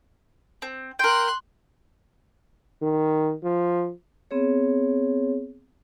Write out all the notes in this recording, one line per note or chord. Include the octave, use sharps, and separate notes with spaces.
C4
A#4 G5 C6 F#6
D#3
F3
B3 C4 G#4 C#5